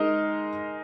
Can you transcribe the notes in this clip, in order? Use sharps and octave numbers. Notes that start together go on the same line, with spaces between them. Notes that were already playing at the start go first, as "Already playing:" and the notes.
Already playing: G#3 D#4 A#4 D#5